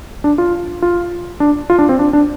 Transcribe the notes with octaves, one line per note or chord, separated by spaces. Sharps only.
D4
F4
F4
D4
F4
D4
C4
D4
D4